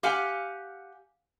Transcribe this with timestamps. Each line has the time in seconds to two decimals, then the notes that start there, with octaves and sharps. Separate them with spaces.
0.03 G4 F5 F#5 G#5